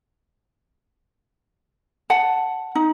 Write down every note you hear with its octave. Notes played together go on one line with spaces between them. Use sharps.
F#5 A5
D#4